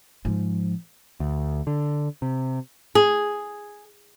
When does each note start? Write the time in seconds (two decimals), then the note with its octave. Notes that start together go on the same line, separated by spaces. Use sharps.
0.25 G#2 F3
1.20 D2
1.67 D3
2.22 C3
2.95 G#4